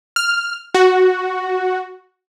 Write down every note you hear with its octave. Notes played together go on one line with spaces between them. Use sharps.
F6
F#4